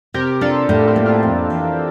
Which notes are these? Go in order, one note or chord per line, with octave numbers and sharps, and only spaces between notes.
C3 G4 A#4
D4 F4 A4
A2 G4 A#4
C4 E4
A#3
D4 F4
F2
E3